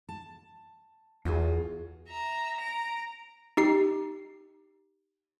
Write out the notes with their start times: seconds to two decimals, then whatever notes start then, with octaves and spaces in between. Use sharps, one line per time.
0.09 A5
1.25 E2 F4 F#4 G#4
2.08 E5 A#5
2.58 A#5 D7
3.57 D#4 G4 C7